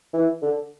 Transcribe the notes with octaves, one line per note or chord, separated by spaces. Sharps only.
E3
D3